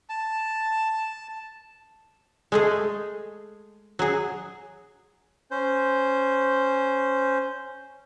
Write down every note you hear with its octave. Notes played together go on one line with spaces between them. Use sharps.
A5
G#3 A3 G#4
F#3 G#4
C#4 C5